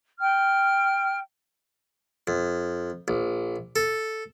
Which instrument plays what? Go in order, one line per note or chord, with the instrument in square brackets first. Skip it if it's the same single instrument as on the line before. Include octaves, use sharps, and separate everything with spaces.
[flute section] G5 F6
[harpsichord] F2
A#1
A4